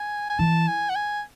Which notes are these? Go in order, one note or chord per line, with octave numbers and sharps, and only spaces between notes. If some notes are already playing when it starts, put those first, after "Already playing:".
Already playing: G#5
G#5
E3 A5
G#5
F#5
G#5